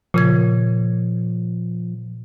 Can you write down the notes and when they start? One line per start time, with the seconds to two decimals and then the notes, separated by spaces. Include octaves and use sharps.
0.14 A#2 C#3 F3 G#6